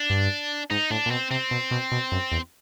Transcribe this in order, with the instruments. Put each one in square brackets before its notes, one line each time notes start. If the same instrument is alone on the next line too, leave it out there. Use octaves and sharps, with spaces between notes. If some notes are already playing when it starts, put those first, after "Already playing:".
Already playing: [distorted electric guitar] D4
[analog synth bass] G2
[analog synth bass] G#2 [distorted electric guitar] D#4
[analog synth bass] A2 [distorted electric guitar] D4
[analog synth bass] A#2
[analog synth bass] B2 [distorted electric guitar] C4
[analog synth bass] C3 [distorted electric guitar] C4
[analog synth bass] B2
B2
B2
F#2
E2